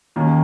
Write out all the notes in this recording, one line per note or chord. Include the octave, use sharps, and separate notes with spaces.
D#2 D#3 A#3 C#4